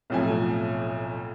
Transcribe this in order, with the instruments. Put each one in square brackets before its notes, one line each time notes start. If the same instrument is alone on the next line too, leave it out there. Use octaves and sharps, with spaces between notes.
[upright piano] B1 F2 A2 F3 G#5